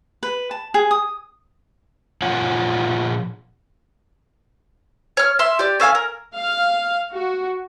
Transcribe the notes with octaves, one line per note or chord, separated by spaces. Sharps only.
B4
A5
G#4
D#6
A#2 F3 F4 C#5 F#5 G#5
C#5 F6
E5 C6
G4 D5
C#4 A4 F5 G#5
A#4
F5
F#4